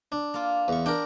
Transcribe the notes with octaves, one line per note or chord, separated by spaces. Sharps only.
D4
A#3 F4
E2 C#6
D4 A#4 G5